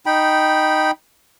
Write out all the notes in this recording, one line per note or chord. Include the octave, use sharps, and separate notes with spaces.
D#4 G5 B5